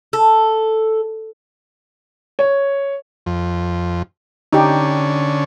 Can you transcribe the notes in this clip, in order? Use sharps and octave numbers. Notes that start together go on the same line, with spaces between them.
A4
C#5
F2
D3 C#4 D#4 G4